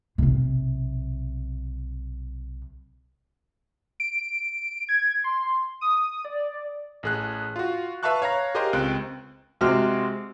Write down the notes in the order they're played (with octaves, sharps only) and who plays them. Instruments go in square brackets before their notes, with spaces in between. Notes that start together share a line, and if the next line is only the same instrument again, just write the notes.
[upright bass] B1 C3
[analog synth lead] D7
G#6
C6
D#6
D5
[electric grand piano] A1 G#4 F#6
F4 F#4
B4 E5 F5 A5 C#6 F#6
C#5 F5 A#5 A#6
G4 G#4 A#4 C5 D#5 F5
C#2 C4 G5 F#6
[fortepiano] C3 G#3 C4 F#4 F6